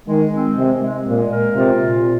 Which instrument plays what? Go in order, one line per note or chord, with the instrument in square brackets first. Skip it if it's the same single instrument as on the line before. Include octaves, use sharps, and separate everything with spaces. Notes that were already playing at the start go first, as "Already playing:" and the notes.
[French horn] D#3 [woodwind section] G#3
[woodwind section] C4
[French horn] C3 [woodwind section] G#3
[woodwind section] G#3
[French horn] A#2 [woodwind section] G#3
[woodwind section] A#4
[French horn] C3 [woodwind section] F4
[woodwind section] A#2